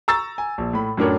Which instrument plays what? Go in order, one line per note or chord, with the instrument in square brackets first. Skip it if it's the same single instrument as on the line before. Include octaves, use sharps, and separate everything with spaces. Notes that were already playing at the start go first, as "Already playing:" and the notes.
[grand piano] A#5 C#6 E6 A6
G#5
A#1
A2 B5
F#2 A2 D4 A#4 C#5